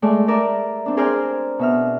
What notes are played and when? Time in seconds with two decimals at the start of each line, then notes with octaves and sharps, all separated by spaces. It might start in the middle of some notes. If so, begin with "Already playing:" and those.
0.02 G#3 A3 D5
0.28 A#4 D5 E5
0.86 C4 D4
0.97 G#4 A#4 C5 D5 G#5 F6
1.59 B2 E5 F6